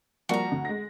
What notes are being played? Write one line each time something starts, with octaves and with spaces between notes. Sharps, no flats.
F3 G3 A#3 F#4 A#5
D2
G#3 A#6